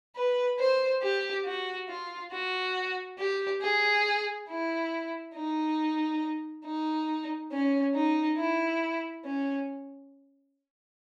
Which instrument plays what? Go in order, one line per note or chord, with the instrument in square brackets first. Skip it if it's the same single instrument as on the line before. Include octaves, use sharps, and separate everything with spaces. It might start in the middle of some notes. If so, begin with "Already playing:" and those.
[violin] B4
C5
G4
F#4
F4
F#4
G4
G#4
E4
D#4
D#4
C#4
D#4
E4
C#4